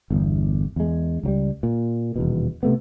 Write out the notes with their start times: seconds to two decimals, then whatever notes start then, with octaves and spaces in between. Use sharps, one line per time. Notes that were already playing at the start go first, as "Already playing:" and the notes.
0.10 G1 E2
0.76 E2 G#3
1.23 C#2 F#3 G3
1.63 A#2
2.16 D#1 E2 B2
2.63 C3 A3 B3